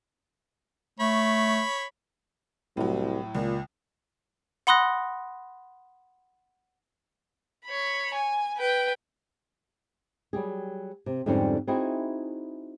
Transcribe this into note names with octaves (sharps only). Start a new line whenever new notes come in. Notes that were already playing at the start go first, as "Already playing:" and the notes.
A3 C#5 B5
C2 A2 F#3
C#2 A#2
F#5 B5 C6 D#6 F#6 A#6
C#5 B5
G#5
B4 G5
F#3 G3 G4 G#4
C3
F2 G#2 D3 G3 C4 C#4
C4 D#4 E4 F#4 G#4